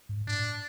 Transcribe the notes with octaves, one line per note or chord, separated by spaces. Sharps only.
G#2
A2 D4